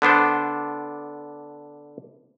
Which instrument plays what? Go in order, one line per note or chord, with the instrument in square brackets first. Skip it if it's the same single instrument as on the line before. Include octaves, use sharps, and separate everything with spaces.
[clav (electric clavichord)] D3 B3 D4 C5